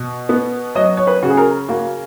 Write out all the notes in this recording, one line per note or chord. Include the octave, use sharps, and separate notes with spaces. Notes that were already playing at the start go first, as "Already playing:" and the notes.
Already playing: B2
B3
F#3 D#5
C#5
B4
C#3 F#4
G#4
A#4
A#3 F#4